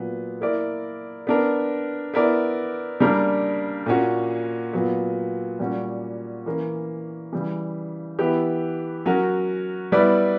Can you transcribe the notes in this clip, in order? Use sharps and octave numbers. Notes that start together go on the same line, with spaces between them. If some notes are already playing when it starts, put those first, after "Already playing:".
Already playing: A#2 F#3 B3
A#3 E4 A#4 D5
B3 D4 A#4
B3 E4 A#4 D5
C#3 G3 A#3 D4 A#4
A#2 A#3 C#4 F#4
A#2 F#3 B3
A#2 G3 C#4 F#4
E3 A#3 C#4
C#3 E3 G3
E3 B3 E4 G4 B4
F#3 C#4 F#4 A#4
G3 B3 E4 B4 D5